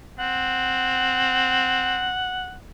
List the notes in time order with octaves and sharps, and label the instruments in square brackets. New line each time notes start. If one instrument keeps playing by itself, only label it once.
[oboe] C4 [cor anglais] F#5